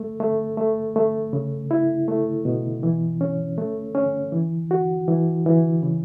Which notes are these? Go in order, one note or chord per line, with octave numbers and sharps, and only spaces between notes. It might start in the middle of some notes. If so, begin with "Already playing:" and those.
Already playing: A3
A3
A3
A3
C#3
E4
A3
B2
E3
C#4
A3
C#4
E3
F#4
E3
E3
C#3